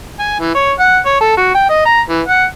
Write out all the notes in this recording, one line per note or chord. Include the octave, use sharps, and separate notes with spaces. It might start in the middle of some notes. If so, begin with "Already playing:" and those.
G#5
E3
C#5
F#5
C#5
A4
F#4
G5
D#5
A#5
E3
F#5